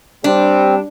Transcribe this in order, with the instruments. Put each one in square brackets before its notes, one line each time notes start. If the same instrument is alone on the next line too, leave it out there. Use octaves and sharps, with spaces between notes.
[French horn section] G3 [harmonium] C4 [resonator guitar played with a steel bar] D4